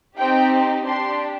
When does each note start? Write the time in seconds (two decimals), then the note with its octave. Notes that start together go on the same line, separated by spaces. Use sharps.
0.17 C4 D#4 G4 G5
0.85 D4 G4 C6